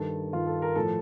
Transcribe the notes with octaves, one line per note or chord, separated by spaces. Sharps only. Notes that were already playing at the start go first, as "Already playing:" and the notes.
Already playing: G2 D#3 A4
G2 D#3 F4
A4
A#4
A2 F3 A4